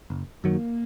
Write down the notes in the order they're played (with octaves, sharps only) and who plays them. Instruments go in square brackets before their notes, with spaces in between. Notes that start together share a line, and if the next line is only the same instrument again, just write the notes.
[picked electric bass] F#1
[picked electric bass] F#2 D#3 F#3 [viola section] A#3